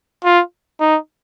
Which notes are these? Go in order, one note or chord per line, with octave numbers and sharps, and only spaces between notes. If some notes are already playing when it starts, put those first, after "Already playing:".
F4
D#4